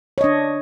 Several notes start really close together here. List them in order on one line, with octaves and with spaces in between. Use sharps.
C#5 D#5 D4